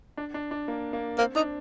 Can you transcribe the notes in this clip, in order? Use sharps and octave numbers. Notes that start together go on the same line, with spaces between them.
D4
D4
D4
A#3
A#3
A#3 C4
D4 D#4